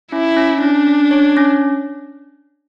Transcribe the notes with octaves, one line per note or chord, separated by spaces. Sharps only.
C#4 E4
C#4
C#4 D4
C#4
C#5
C#4